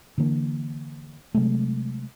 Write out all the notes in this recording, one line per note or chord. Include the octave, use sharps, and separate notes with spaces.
D3 E3 A#3 D4
C3 F#3 G#3 A3